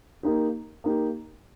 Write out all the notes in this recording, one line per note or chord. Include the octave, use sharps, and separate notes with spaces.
A#3 D#4 G4
A#3 D#4 G4